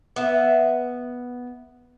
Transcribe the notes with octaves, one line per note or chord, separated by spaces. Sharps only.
B3 E5